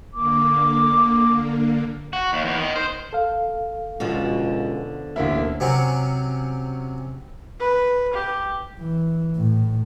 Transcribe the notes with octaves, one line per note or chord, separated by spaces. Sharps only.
D3 A#3 D6
F#4
D#2
E2
D#3
C5
A4 F5
C#2 B2 D3 F3
A1 D2 A#3 E4
C3 F#3 C4 C#4
B4
G4
E3
A2